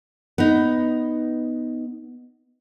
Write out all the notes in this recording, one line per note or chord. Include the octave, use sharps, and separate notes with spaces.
B3 D#4